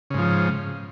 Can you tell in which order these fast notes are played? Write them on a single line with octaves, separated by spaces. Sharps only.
C#3 G#2 F3